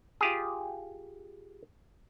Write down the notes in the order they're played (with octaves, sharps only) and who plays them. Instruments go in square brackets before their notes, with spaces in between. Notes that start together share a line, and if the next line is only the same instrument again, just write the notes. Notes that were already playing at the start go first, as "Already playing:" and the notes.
[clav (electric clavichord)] F4 G4 G#4